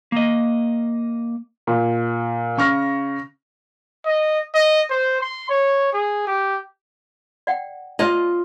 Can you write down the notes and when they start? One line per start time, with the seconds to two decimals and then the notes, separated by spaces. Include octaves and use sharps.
0.12 A#3 D#5
1.67 A#2
2.57 C#3 C#6 F6 A#6
4.06 D#5
4.54 D#5
4.90 C5
5.21 C6
5.49 C#5
5.93 G#4
6.27 G4
7.47 D5 F#5 G5
7.99 F4 C5 D5 D#5 A5